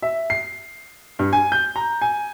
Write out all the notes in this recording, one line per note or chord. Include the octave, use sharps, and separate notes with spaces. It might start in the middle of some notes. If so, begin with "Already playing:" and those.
E5
C7
G2
G#5
G6
A#5
G#5